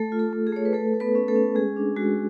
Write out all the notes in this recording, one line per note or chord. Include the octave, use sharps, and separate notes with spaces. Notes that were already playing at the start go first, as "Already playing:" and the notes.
Already playing: A3 A4
F4
A3 A4
A3
G#4
A3 C#5
B4
A3 A4
A3
B3 B4
C#4
A3 A4
C#4
G#3 G#4
D4
G#3 F#4